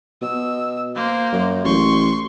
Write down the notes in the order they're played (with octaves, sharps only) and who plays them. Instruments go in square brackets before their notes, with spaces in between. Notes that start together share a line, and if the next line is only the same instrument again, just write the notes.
[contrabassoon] B2 [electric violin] E6
[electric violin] A#3 C5
[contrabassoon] F#2
[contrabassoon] A1 [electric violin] C6 C#6